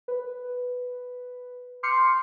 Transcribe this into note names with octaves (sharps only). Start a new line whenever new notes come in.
B4
C6 D6 F6 G6 C7 C#7